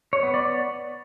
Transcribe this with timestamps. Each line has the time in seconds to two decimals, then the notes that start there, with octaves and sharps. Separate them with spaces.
0.13 C#5
0.23 B3
0.34 D5